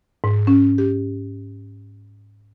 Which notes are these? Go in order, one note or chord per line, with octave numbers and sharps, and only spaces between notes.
G#2
C#4
G4